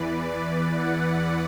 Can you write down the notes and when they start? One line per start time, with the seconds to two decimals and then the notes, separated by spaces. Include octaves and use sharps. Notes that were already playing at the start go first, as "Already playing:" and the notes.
Already playing: E2 E3 B4 D5
0.24 D5
0.71 F#5